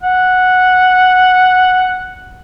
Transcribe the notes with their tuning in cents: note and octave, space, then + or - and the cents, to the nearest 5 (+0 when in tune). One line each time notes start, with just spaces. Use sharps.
F#5 -5